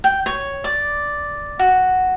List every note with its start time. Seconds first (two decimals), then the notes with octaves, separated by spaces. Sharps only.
0.04 G5
0.26 C#5
0.64 D5
1.59 F#4